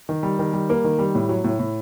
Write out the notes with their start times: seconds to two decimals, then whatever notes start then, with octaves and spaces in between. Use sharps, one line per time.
0.09 D#3
0.23 G3
0.39 D#3
0.53 G3
0.70 A#3
0.84 D#3
0.99 G3
1.15 A2
1.29 F#3
1.44 A2
1.59 A2